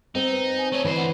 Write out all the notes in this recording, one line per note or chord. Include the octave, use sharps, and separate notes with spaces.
C4 D#4
B4
G#5
A3 C#5 D#5
D2 E3 C5
F#5